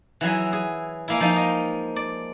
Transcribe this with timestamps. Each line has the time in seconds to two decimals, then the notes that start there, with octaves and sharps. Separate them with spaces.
0.21 E3 F#3 E4 G#4
0.53 G#4
1.08 G#3 A#3 E4
1.20 F3 G#3 D#4
1.36 D#5
1.96 D5